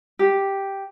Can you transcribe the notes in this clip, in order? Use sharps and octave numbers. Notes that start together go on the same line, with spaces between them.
G4